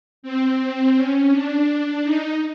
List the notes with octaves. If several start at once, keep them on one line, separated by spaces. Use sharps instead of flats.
C4
C#4
D4
D#4